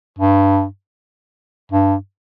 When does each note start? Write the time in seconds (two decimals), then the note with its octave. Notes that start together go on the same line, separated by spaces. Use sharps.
0.19 G2
1.72 G2